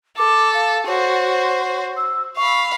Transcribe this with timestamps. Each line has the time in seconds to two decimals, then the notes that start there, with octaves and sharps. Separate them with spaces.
0.18 A4 D6
0.54 F5
0.87 F#4 C5 C#5
1.97 E6
2.37 F5 B5 C#6